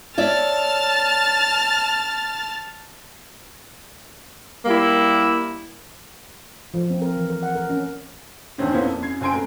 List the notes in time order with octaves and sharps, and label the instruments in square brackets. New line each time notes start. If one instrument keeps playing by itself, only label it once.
[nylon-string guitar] C#5 D5 E5 [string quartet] A5 F6 A6
[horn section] G3 A#3 E4
[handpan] F3
C4
A#4
E3
A#4
F#5
A#4
C#4
[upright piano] E2 G2 D#3 C4 C#4
A#3 B3 C#4 E4 C5
F2
F#2 G#6 C7
F#1 C4 G#5 C6 D7
A3 A#4